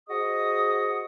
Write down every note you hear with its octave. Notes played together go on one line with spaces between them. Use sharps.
F#4 G#4 C5 D#5 C#6 D#6